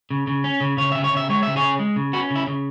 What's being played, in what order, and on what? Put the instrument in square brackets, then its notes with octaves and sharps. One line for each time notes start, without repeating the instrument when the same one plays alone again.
[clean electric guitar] C#3
C#3
C#4
C#3
C#3 C#5
C#3 E5
C#5
C#3
E5
G#3 C#5
C#3 E5
G#4 C#5
C#3
G#3
C#3
C#4 F#4 B4
C#3
E4
C#3